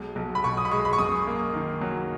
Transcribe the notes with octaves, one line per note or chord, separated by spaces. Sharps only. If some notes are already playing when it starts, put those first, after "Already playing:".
Already playing: B1 G#3
B1
B5
B2 C#6
D#6
B5
G#3 C#6
B5
C#6
F#2 D#6
A#3
D#3
F#3